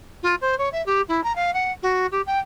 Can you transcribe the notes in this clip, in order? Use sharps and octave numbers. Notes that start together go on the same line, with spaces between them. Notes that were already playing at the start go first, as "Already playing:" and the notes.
F4
C5
C#5
E5
G4
E4
A#5
F5
F#5
F#4
G4
G5